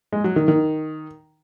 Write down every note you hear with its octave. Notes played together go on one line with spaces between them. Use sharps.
G#3
F#3
D#3
D#3